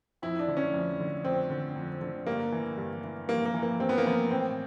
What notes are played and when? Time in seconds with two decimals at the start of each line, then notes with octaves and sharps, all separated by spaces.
0.22 F2 E4
0.39 D4
0.48 D3
0.57 C#4
0.74 F2
0.99 D3
1.25 F2 C4
1.50 D3
1.76 F2
2.01 D3
2.26 G2 A#3
2.52 E3
2.78 G2
3.04 E3
3.29 G2 A#3
3.45 A#3
3.54 E3
3.63 A#3
3.80 G2 C4
3.89 B3
3.98 A#3
4.05 E3 B3
4.31 A2 C4